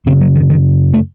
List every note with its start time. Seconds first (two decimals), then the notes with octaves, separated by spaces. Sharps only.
0.06 F#2 C#3 C4
0.21 F#3
0.35 D#3
0.50 D#3
0.94 A3